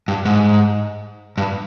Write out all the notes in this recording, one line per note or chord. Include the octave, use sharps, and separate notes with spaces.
G2
G#2
G2